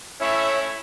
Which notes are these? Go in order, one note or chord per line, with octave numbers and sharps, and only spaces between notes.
A3 C#4 E4 C#5 E5